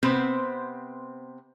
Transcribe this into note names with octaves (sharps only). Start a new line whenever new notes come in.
C3 B3 C4 B4 C5